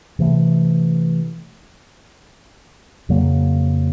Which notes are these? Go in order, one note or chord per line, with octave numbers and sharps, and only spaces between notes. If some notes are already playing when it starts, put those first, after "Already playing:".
C3 E3 A3
F2 C#3 F#3 A#3